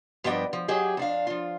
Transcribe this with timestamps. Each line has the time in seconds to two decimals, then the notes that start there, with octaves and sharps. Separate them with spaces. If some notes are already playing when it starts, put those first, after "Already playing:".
0.24 G2 F3 B3 D4 D#5 G5
0.53 F3
0.68 F#3 G4 G#4 D#5
0.97 F2 D4 F5
1.27 F3 F4